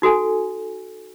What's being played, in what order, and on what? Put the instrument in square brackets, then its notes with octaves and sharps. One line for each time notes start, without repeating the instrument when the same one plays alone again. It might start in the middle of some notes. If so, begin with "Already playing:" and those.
[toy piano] D#4 F#4 A4 G#5